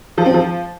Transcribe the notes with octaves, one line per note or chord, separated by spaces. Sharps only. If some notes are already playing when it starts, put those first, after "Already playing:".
F3
C4
F3